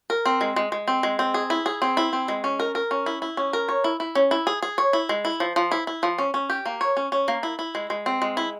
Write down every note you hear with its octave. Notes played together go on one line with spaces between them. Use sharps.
A#4
C4
G#3
G#3
G#3
C4
G#3
C4
G#4
E4
G#4
C4
E4
C4
G#3
C#4
A#4
A#4
C#4
E4
E4
C#4
A#4
C#5
E4
E4
C#4
E4
G#4
G#4
C#5
E4
G#3
E4
F3
F3
E4
E4
F3
C#4
C#4
G4
A#3
C#5
C#4
C#4
A#3
E4
E4
G#3
G#3
C4
G#3
E4